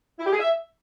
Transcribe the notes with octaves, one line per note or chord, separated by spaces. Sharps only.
E4
G4
G#4
E5